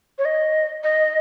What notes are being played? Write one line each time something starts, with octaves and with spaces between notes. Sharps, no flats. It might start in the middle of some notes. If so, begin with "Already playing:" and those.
C#5
D#5
D#5